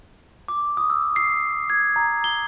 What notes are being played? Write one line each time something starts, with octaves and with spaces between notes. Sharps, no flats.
D6
D#6
E6
C7
G#6
A#5
G7